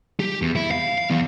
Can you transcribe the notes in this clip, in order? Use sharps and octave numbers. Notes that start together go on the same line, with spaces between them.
G4
E2
E4
F5
F5
E3 B3